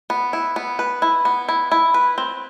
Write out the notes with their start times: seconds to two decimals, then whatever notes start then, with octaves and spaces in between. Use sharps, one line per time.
0.10 B3
0.33 E4
0.56 B3
0.79 B4
1.02 E4
1.25 B3
1.48 E4
1.72 E4
1.94 B4
2.18 C4